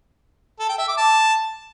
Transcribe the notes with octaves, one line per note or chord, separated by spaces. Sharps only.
A4
G5
E5
D6
A5